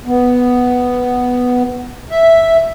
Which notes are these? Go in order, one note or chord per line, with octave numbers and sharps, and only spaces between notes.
B3
E5